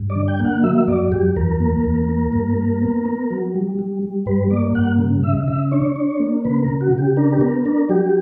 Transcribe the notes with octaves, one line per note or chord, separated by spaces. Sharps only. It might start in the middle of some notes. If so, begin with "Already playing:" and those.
Already playing: G2
D5
D3
G5
A#3
F#5
F#3 E5
F#2 D5
F#2 G4
E2 A#4
A#3
E2
A#3
G2
A#3
B3
B3
F#3
G3
G3
G3
G2 B4
A#3 D5
G2 F#5
C#3
C#3 E5
C#3 E5
D4 C#5
D4
A#3
C#3 B4
A#4
C#3
F#4
C#3
G4
D4 A#4
G4
B3 A#4
D4 A#4
F#3 G4